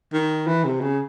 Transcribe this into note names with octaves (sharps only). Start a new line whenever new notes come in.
D#3
E3
C3
C#3